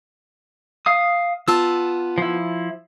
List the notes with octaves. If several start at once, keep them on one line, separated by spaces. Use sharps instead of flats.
F5 D#6
B3 F4 A5 E6
F3 E4